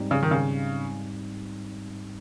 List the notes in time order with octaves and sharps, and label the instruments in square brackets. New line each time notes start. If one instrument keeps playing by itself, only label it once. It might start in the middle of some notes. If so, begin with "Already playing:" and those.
Already playing: [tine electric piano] G#2 G3 C4 D#4
[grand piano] C#3
D#3
C#3